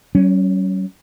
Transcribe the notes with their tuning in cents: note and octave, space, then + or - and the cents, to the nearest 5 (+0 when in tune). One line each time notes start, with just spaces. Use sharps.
F#3 +45 C#4 +0